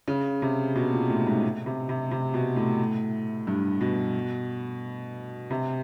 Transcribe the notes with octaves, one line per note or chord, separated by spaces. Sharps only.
C#3
C3
B2
A#2
A2
G#2
C3
C3
C3
B2
A2
G2
B2
C3